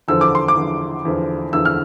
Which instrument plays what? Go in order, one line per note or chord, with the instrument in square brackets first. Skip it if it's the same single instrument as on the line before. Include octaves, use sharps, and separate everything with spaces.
[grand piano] E2 D3 F3 E6
D6
C6
D6
E2 D3 F3
E2 D3 F3
E2 D3 F3 E6
F6